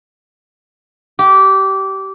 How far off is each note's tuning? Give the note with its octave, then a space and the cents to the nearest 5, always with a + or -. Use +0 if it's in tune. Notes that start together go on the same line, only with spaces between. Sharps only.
G4 -20